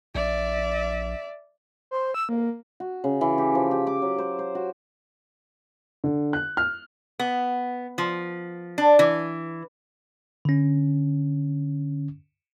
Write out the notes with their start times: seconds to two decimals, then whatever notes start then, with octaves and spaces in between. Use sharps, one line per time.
0.15 A#1 D5 E5
1.91 C5
2.14 E6
2.29 A#3
2.80 F#4
3.04 C#3
3.21 E3
3.38 G4
3.55 F3
3.71 G4
3.87 D6
4.02 F#3
4.18 C5
4.39 C5
4.55 F#4
6.04 D3
6.33 F#6
6.57 F6
7.19 B3
7.98 F3
8.78 D4
8.99 E3
10.45 D3 C#4